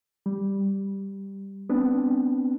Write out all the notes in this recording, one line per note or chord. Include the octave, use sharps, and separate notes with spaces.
G3
B3 C4 D4